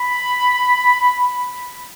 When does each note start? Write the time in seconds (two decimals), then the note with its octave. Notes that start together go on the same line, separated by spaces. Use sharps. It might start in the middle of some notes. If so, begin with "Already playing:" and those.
Already playing: B5